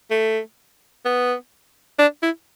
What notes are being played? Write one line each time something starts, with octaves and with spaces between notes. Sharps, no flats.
A3
B3
D4
E4